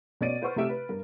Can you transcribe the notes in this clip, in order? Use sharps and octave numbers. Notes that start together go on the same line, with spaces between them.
B2 C#4 D5 A6 D7 D#7
B4 C5 F#5 C#6 F6
C3 A3 G4 E5 D7
B4
G2 A#4